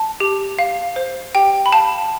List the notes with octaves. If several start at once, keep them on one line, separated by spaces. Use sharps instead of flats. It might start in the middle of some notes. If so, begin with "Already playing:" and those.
Already playing: A5
G4
F5
C5
G4 G5
B5
F5 A5